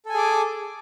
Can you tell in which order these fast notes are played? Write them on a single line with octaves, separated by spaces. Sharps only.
A4 G#5 G#4 D6